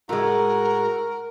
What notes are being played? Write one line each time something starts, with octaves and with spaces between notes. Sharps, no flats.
A2 G#3 F#4 A#4 A#5